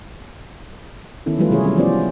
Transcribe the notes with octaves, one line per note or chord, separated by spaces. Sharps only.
D#3 B3 C#4 E4 A4
E3 F#3 G3 A3 F4 B4
C3 G#3 E4 G#4 C#5
G3 C#4 G#4
F3 B3 C#4 F4 C5 D5
D#4